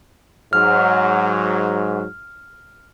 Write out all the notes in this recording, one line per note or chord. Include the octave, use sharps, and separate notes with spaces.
G#2 F#3 F6